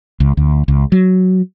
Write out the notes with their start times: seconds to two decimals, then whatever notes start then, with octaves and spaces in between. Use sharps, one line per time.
0.20 C#2
0.37 D2
0.68 C#2
0.92 F#3